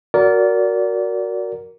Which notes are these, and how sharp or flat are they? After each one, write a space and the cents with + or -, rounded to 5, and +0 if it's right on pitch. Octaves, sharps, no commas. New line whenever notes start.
F#4 +0 A#4 +0 D5 -25